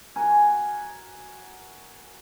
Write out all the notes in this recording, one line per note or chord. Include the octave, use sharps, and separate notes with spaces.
F#4 A#4 G#5